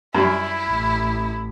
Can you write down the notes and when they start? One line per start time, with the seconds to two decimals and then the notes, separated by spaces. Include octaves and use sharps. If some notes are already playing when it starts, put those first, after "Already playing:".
0.15 F#2 G3 E4
0.69 A1